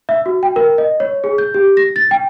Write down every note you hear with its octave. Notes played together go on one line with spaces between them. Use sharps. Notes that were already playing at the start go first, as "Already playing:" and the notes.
E5
F#4
G5
A#4
D#5
C#5
G#4
G6
G4
A#6
A6
G5